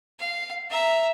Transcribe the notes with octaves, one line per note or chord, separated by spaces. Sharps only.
F5
E5 A#5